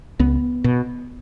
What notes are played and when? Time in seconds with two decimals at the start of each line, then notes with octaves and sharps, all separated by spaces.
0.19 C#2 B3
0.64 B2